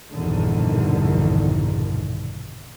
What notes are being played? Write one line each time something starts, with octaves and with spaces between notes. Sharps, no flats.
A#1 E2 G2 B2 D3 D#3